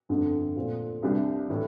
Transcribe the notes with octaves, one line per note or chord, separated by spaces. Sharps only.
G1 F2 D3
A#2 A3 C4
C2 C3 G3 D4 G4
A2 E3